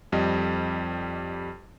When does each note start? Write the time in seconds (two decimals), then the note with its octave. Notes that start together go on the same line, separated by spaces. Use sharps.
0.12 F2 G3 D#5